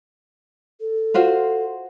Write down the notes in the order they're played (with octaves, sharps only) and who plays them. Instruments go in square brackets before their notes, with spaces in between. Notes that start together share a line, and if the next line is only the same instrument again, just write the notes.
[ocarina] A4
[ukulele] F4 F#4 C5